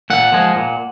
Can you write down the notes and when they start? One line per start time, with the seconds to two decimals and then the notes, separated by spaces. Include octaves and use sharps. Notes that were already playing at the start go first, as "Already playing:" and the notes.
0.10 A#2 F#5
0.33 F3 G#3
0.56 A#2